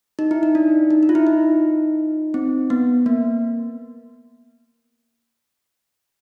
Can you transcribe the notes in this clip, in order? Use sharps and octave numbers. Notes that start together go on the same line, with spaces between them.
D#4
E4
D#4
D4
D#4
D#4
F4
E4
D#4
C4
B3
A#3